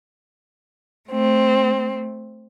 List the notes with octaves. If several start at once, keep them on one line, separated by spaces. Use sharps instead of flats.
A3 C4